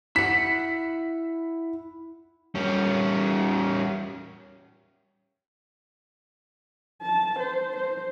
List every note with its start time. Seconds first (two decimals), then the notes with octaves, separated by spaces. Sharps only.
0.16 E4 F#5 B6
2.55 G3 C#4
7.02 A5
7.39 C5
7.76 C5